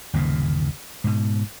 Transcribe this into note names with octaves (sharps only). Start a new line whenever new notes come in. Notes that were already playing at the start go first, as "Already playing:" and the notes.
G1 D#2 A#2 C#3
G#2 B2